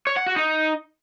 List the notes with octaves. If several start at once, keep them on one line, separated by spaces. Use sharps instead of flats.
C#5
F#5
F#4
D#4